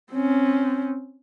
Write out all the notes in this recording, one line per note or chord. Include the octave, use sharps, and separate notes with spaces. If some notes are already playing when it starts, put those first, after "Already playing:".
C4 C#4